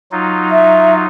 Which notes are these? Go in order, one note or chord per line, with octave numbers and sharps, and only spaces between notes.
F#3 D#4 F4
E5